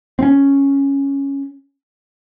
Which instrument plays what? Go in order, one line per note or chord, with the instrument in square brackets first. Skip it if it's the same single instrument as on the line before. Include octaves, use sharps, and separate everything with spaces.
[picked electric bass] C4 C#4